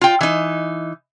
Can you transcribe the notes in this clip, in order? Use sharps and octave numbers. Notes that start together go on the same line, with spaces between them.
F4 G5
E3 D#4